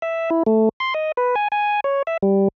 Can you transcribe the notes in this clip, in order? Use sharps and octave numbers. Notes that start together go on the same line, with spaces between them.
E5
E4
A3
C6
D#5
B4
G#5
G#5
C#5
E5
G3